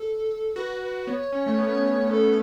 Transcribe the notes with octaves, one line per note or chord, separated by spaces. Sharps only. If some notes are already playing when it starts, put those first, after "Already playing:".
Already playing: A4
F#4 B4
B4
B3 C#5
C#4
A3
B3
A4